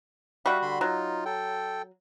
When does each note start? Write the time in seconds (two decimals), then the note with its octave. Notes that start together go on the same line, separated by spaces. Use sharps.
0.46 G3 F#4 E5 F5
0.62 D3 B5 C6
0.81 F#3 D#4 F4
1.25 A4 G5